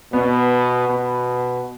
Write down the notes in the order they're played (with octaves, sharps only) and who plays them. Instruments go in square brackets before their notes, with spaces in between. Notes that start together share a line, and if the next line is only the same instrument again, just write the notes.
[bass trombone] B2 [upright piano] B3
[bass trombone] B2